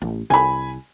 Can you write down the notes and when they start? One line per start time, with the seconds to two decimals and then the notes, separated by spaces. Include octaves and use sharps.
0.01 A1
0.30 C2 G#5 B5